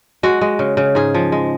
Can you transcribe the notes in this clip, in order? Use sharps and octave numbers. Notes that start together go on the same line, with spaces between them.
G#3 F#4
G#3
C#3
C#3
G#2 G#4
F3
G#3